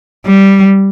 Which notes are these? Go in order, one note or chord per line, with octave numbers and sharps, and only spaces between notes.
G3